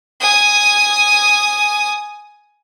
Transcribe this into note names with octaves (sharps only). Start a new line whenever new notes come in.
G#5 D#6